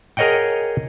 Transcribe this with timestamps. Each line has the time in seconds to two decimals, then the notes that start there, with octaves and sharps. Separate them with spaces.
0.17 G#4 A#4 C#5 D#5 F#5 G5